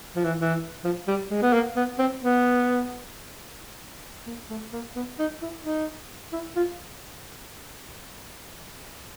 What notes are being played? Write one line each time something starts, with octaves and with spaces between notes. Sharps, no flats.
F3
E3
E3
F3
G3
G#3
B3
A#3
B3
C4
B3
A#3
A3
A#3
B3
D#4
E4
D#4
E4
F4